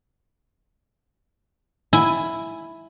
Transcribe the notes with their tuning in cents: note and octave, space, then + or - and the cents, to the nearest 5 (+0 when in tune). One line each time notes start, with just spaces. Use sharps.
E4 +0 G#5 +0